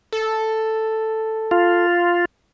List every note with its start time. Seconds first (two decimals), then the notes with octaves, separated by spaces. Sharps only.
0.13 A4
1.51 F4